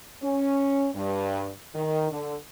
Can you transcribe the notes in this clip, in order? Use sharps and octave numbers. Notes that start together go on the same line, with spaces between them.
C#4
G2
D#3
D3